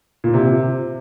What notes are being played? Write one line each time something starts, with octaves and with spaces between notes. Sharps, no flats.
A#2
C3